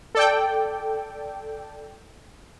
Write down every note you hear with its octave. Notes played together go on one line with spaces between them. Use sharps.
A4 D5 G5